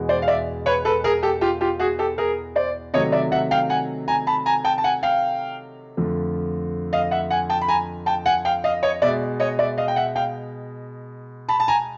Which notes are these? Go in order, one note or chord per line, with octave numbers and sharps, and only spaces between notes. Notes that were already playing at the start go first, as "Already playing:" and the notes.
Already playing: E2 B2 G#3
C5 D5
F5
D5 E5
B4 C#5
A4 B4
G#4 A#4
G4 A4
F4 G4
F4 G4
F#4 G#4
G4 A4
G#4 A#4
C5 D5
C3 D#3 F#3 A3 C#5 D#5
D5 E5
E5 F#5
F5 G5
F#5 G#5
G#5 A#5
A5 B5
G#5 A#5
G5 A5
A5
F#5 G#5
F5 G5
F2 D3 F3 A3
D#5 F5
E5 F#5
F#5 G#5
G5 A5
B5
G#5 A#5
G5 A5
F#5 G#5
F5 G5
D#5 F5
C#5 D#5
B2 G#3 D5 E5
C#5 D#5
D5 E5
D#5 F5
G5
E5 F#5
F5 G5
A5 B5
A5
G#5 A#5